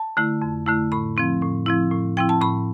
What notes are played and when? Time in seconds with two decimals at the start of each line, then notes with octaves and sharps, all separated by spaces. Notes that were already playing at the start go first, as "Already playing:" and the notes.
Already playing: A5
0.17 D3 A3 E4
0.42 F2
0.66 D3 A3 E4
0.92 A2 B5
1.17 F3 C4 E4
1.42 A2
1.66 F3 C4 E4
1.92 A2
2.17 F3 C4 E4 G5
2.29 A5
2.42 A2 B5